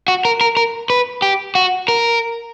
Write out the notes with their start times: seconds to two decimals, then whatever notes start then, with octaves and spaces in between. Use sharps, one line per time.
0.08 F#4
0.25 A#4
0.41 A#4
0.57 A#4
0.90 B4
1.22 G4
1.55 F#4
1.88 A#4